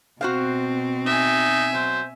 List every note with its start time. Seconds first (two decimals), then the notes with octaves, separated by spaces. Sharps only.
0.21 B2 C4 F#4 C5 F5
1.06 D#4 E5 G#5
1.74 F#3 C5